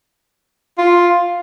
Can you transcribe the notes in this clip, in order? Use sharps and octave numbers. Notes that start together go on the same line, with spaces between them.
F4